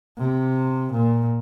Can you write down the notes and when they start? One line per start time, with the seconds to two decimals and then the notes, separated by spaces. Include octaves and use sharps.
0.18 C3
0.92 A#2